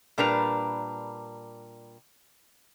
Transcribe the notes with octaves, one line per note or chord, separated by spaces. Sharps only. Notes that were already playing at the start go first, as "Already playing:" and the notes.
A#2 G3 D4 A#4 B4 A#5